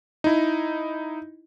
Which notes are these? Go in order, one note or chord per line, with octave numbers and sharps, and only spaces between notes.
D#4 E4